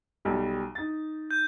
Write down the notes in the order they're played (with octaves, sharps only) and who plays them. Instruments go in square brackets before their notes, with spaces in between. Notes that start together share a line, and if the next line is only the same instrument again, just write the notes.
[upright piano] B1 G3
D#4 A6
[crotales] G6